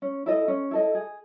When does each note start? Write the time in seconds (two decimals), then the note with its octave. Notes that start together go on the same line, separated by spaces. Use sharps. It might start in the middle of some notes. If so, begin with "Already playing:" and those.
0.02 C#4
0.26 E4 A4 D#5
0.48 C#4
0.71 E4 A4 D#5
0.95 G#4